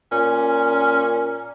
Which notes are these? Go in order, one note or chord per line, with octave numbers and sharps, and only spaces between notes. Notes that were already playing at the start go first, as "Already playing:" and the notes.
A#2 C#4